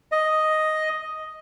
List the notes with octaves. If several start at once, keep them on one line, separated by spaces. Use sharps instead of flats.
D#5